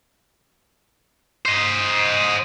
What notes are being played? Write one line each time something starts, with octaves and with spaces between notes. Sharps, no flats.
C5 D#5